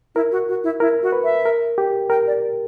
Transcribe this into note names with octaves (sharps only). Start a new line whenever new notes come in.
E4 A#4
F#4
F#4
E4
E4 A#4
F#4
B4
E5
A#4
G4
A#4 G5
D5